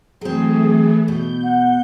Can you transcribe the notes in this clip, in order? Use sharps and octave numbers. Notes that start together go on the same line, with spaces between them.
E3 F#3 A3 C4 G#4
B2 G6
F#5